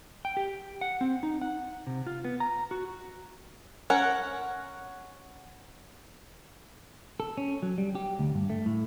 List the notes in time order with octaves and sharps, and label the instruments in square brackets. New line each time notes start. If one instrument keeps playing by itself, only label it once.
[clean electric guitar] G5
G4
F#5
C4
D#4
F#5
C3
F4
B3
A#5
F#4
[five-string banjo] C#4 A#4 [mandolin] F#5
[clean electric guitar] A4
C#4
F#3
G3
G4
D2
G2
A3
A2